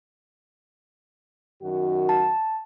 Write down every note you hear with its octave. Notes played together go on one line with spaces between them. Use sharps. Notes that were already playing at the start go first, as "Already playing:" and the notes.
F#2 D#3 F#4
A5